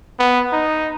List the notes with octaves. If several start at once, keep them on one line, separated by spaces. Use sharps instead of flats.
B3
D#4